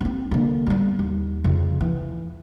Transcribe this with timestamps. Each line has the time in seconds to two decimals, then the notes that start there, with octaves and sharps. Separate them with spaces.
0.01 B3 C4
0.31 D3 A#3
0.67 G3 B3
0.99 D#2
1.44 F2 C#3
1.81 E3